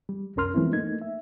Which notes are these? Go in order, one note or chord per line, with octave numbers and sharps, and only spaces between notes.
G3
C2 F#2 C#4 A#4 C6 F6
E3 F3 G#3 B3 C4 E4
A3 A#3 D#4 G#6
E5